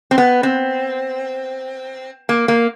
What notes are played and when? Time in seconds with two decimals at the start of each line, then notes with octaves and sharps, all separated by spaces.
0.11 C4
0.18 B3
0.43 C4
2.29 A#3
2.48 A#3